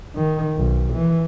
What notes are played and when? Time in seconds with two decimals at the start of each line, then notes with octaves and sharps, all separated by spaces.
0.16 D#3
0.57 B1
0.94 E3